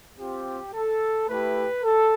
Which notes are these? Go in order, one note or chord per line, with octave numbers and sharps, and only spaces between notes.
C4 F4 G4
A4
A3 E4 G4 B4
A4